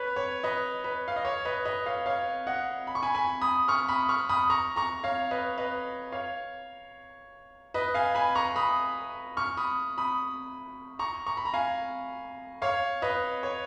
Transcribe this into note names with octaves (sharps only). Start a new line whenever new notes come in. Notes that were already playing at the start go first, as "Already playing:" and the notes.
Already playing: B4 C#5
C#5
B4 D#5
B4
F5
D#5
C#5
B4 D#5
B4 D#5
C#5 F5
C#5 F5
D#5 F#5
B5
C#6
G#5 B5
G#5 B5
B5 D#6
C#6 F6
B5 D#6
C#6 F6
B5 D#6
A#5 C#6
A#5 C#6
C#5 F5
B4 D#5
B4 D#5
C#5 F5
B4 D#5
F5 G#5
G#5 B5
A#5 C#6
B5 D#6
C#6 F6
B5 D#6
B5 D#6
A#5 C#6
A#5 C#6
B5
A#5
F5 G#5
C#5 F5
B4 D#5
C#5